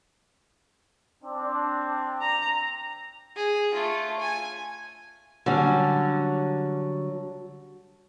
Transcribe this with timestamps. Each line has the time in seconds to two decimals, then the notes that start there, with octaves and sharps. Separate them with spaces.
1.22 C4 D4
2.21 A#5
3.36 G#4
3.74 A3 F4
4.19 G#5
5.46 D3 F#3 G3 C#4